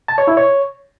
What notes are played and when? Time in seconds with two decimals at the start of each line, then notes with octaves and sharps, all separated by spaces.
0.08 A5
0.18 C#5
0.27 E4
0.37 C#5